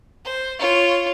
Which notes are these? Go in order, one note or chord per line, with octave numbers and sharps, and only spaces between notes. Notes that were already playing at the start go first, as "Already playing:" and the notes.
C5
F4 C#5